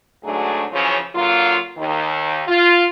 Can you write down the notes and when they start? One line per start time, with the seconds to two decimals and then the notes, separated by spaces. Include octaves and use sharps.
0.24 D2 G#2 F#3 A3 D4 G#4
0.72 F#2 C#3 E3 F3 C#4 C#5
1.15 D3 F#3 A#3 F4
1.78 D#2 D#3
2.48 F4